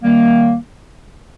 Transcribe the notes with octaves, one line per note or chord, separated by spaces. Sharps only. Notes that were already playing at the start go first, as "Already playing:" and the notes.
D#3 G3 A#3